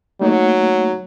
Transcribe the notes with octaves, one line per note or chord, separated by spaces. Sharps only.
F#3 A3 A#3 D#4